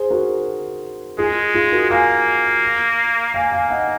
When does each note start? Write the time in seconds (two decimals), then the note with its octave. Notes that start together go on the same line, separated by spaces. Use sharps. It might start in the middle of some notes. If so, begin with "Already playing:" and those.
Already playing: G#4 C5
0.10 F#4 A#4
1.18 G#3 F4 G#4
1.55 F4 G#4
1.72 F#4 A#4
1.90 A#3 F5 G#5
3.34 A#3 F5 G#5
3.52 F5 G#5
3.70 D#5 F#5